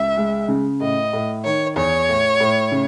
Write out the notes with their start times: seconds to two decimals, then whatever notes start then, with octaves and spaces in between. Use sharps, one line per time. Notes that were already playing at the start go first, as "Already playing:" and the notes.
Already playing: C#2 E5
0.17 G#3
0.48 C#3
0.81 A2 D#5
1.13 A2
1.45 D#3 C#5
1.76 E2 C#5
2.09 A2
2.40 A2
2.72 C#3